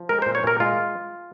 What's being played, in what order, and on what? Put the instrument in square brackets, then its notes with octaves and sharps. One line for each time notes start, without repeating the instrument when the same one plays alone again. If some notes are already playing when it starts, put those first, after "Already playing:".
Already playing: [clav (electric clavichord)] F3
G#3 A#4
C5
A#2
C#5
A#2 A#4
G#3 F4